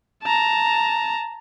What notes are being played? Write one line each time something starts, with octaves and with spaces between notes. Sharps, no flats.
A5 A#5